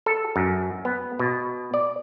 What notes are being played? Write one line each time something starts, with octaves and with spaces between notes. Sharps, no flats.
A4
F#2
B3
B2
D5